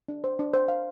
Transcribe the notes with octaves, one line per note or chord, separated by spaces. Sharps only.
D4
C5
D4
C5
F5